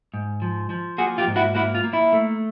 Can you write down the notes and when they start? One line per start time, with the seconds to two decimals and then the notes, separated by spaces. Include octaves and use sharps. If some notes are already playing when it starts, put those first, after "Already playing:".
0.14 G#2
0.42 F3
0.70 F3
0.98 A#3 F#4 G#4
1.18 F4 G4
1.27 G#2
1.36 E4 F#4
1.55 A#3 E4 F#4
1.75 F4
1.84 A#3
1.93 E4
2.12 A3